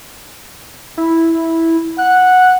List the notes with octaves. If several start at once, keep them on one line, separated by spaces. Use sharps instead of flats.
E4
F#5 F#6